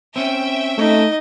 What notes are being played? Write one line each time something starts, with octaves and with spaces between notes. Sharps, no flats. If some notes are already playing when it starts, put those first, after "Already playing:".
C4 C#4 E5 G5
A3 D#4 D#5